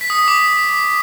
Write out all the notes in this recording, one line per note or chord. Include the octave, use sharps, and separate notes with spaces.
B6
D#6
B6
D6